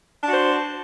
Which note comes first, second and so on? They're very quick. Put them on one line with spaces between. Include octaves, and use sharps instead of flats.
D4 F#4 C5